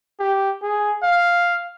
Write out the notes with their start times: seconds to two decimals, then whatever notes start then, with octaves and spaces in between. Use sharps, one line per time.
0.20 G4
0.63 G#4
1.03 F5